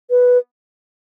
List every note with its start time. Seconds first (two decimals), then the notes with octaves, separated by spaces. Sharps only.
0.10 B4